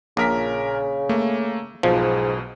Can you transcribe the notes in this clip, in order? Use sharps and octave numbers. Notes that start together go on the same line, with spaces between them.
A#1 A#2 C#3 A#4 B6
A3 A#3
B1 G#2 B2 F3